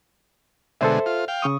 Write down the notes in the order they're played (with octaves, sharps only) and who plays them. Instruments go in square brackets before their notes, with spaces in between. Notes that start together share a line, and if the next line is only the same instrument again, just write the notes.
[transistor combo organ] B2 D3 G#3 [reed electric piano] A4 C5 E5
[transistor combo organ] F4
F5 G5
[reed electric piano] C#3 C#6 D#6